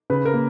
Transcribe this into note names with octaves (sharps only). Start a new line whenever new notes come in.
C#3 B4
A#4
A#3